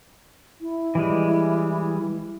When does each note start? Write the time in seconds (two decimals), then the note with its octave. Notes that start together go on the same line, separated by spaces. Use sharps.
0.61 E4
0.95 E3 G3 G#3